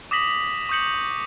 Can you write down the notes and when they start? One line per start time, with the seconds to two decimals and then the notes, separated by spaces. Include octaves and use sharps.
0.11 D6 D#6 A#6 B6 F#7
0.69 C#6 D#6 G6 C#7 F#7